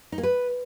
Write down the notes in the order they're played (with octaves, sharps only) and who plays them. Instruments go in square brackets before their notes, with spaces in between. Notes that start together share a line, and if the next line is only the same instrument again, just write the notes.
[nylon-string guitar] D#4
A#3
B4